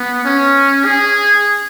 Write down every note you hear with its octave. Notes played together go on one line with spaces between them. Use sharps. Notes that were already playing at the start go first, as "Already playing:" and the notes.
Already playing: B3
C#4
G#4